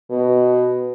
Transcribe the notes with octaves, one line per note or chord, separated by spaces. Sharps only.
B2